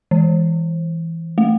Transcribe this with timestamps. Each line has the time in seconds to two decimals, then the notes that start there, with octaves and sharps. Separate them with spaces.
0.11 E3
1.38 A3